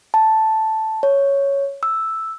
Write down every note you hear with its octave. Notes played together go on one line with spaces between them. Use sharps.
A5
C#5
E6